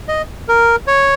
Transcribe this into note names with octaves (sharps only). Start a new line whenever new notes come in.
D#5
A#4
C#5